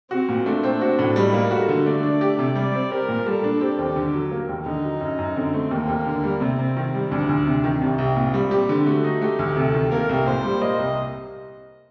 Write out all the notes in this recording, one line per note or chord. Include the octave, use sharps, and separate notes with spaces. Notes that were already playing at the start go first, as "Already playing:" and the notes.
C4 F#4
A#2
A3 D4
C4
F#4
A2
G3 D#4
A#3
F#4 A4
D3
A3 D5
D4
G4
C3
G3 D5
C4
G4 A#4
A#2
G3 A4
D4
C4 G4
D#2
D3
F#3
A#3
D#2
D3 D#4
F#3
F#2
F#2
D3 C4
A3
D#2 A#3
D#2
D3
G3
C3 C4
C3
D#3
G3
D2 D4
D2
C3
D#3
C2 C4
C2
A#2
G3
C4 G4
D3
A3 F#4
D#4
A3 G4
D2
C3 A4
D#3
A#3 A#4
C2
A#2 C5
G3
A#3 D#5
C2